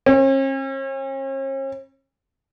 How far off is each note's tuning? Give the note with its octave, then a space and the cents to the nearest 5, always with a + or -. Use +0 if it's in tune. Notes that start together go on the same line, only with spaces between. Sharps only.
C#4 -45